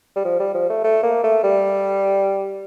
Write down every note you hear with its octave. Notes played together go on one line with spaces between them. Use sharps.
G3
F3
G3
F3
A3
A3
A#3
A3
G3